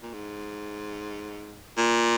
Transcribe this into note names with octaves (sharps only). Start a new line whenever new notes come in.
A#2
G#2
A#2